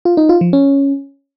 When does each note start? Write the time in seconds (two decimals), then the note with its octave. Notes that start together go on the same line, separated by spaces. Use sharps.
0.05 F4
0.17 D#4
0.29 F4
0.41 F3
0.53 C#4